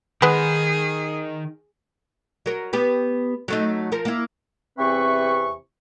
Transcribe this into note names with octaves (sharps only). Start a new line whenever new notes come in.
D#3 G#3 B3 G#4
F#3 A#4
B3 G4 B4
F#3 A3 D#4
F3 A#4
A#3 E4
E2 C3 E3 C4 B4 C#6